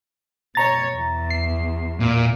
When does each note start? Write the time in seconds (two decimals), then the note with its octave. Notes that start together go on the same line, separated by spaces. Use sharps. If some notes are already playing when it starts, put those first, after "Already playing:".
0.55 B2 C#5 A#5 A6
0.96 E2
1.30 C7
2.00 A#2